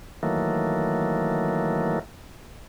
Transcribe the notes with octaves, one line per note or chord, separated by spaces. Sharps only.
D#3 E3 F#3 A3 A#3